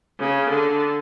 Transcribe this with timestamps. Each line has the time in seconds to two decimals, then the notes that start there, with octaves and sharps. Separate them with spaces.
0.18 C#3
0.49 D3